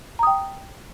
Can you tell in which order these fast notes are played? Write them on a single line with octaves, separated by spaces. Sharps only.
A#5 D#6 G5